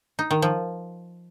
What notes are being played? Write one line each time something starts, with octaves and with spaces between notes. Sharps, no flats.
D#4
D#3
F3